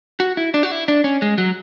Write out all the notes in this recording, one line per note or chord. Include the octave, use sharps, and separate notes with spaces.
F#4
E4
D4
F#4
E4
D4
C#4
G#3
F#3